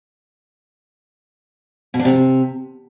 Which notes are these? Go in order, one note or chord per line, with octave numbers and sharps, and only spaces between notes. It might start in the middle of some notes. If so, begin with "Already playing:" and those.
B2
D4
C3